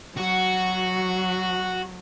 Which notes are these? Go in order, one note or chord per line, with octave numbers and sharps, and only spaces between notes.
F#3 F#4